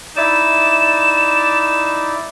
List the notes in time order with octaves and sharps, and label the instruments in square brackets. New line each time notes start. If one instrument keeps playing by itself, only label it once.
[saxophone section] D#4 E4 D5 [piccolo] E7